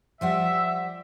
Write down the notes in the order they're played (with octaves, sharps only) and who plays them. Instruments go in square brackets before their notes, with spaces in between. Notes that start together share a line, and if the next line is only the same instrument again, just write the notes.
[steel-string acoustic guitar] F3 G3 F#5 [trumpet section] E5